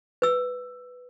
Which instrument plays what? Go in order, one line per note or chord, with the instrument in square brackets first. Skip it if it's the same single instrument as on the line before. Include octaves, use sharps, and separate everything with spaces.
[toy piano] B4 E6